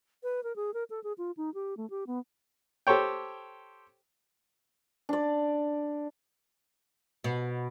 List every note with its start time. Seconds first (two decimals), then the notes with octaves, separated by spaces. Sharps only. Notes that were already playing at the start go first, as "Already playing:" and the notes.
0.23 B4
0.44 A#4
0.56 G#4
0.74 A#4
0.90 A4
1.04 G#4
1.18 F4
1.37 D#4
1.54 G4
1.77 A3
1.90 G4
2.07 B3
2.87 G4 A4 C5 C#5 G5
5.09 D4 D5
7.24 B2